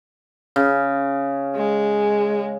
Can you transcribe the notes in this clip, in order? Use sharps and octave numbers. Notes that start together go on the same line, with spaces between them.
C#3
G#3